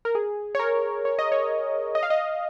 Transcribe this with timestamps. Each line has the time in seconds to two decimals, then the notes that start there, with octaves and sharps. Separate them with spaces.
0.05 A#4
0.15 G#4
0.55 C#5
0.59 A#4
1.05 C#5
1.19 D#5
1.32 C#5
1.95 D#5
2.03 F5
2.10 D#5